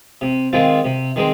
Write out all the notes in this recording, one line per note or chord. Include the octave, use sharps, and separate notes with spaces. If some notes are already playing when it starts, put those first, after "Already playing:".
C3
D#3 G#3 C4 F4
C3
D#3 G#3 C4